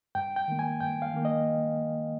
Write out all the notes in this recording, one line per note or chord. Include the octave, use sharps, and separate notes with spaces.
G2 G5
G5
D#3 A#3
G#5
G2 G5
F5
D#3 A#3
D#5